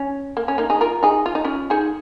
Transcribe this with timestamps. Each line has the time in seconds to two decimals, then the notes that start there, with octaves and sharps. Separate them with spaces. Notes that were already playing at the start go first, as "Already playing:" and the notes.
Already playing: C#4
0.37 A#3
0.48 C#4
0.58 A#3 D#4
0.70 D#4 G#4
0.81 F4 A#4
1.03 D#4 G#4
1.26 F4
1.35 D#4
1.45 C#4 F4
1.70 D#4 G#4